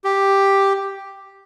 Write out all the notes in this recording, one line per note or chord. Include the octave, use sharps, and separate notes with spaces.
G4